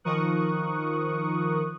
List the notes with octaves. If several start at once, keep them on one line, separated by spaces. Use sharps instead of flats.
D#3 F3 A#4 C#6 D#6 F#6